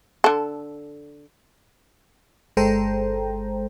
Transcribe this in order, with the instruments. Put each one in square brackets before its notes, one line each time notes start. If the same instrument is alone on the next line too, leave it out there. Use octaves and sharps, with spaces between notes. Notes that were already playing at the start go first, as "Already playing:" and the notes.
[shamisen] D3 A4
[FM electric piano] G1 G#3 A4 C5 G5 A#5